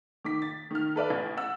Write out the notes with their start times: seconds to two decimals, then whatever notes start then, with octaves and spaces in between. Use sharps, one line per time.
0.25 D#3 D6 B6
0.42 A6
0.71 D#3 F6
0.96 A4 B4 D5 E5
1.10 A1
1.37 F#5 E6